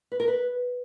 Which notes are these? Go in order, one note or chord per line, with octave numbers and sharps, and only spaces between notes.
B4
A#4
B4